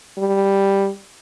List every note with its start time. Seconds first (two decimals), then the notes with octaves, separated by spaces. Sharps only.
0.18 G3